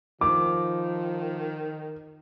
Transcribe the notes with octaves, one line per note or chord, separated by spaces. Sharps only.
D#3 F3 D6